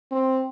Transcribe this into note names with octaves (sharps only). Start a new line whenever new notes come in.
C4